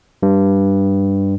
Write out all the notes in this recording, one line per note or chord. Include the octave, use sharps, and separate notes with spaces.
G2